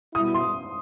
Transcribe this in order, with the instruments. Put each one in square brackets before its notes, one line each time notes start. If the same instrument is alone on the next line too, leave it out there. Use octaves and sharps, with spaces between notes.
[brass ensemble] B2 G3 B3 E4 [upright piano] D#6
[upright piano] C6